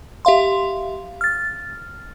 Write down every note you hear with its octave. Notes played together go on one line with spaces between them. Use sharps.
G4 E5 F5 C6
F6 A6